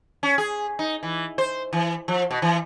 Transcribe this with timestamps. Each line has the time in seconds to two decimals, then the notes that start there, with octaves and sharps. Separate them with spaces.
0.23 C#4
0.38 G#4
0.79 D#4
1.03 E3
1.38 C5
1.73 E3
2.08 F3
2.31 B2
2.42 E3